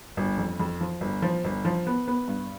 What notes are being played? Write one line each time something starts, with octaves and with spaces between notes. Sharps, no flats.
G1
F2
F2
F3
G1
F3
G1
F3
B3
B3
G2